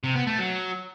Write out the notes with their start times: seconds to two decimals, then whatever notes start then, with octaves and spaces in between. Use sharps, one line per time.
0.04 C3
0.15 B3
0.27 A3
0.38 F#3